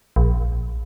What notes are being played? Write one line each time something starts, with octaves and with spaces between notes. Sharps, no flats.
A#1